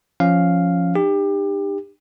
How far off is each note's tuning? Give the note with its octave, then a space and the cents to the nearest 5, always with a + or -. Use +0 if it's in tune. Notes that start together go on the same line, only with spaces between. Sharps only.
F3 +0 C#4 +0 F5 +0
D#4 -45 G4 +25